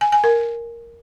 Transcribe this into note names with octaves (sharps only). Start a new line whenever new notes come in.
G#5
G#5
A#4